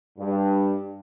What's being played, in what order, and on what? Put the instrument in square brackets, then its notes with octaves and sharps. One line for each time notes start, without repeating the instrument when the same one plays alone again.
[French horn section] G2